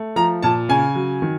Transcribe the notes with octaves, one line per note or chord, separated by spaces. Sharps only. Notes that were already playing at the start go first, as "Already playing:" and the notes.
Already playing: A3
F3 A#5
A#2 A5
C#3 G#5
F#3
D#3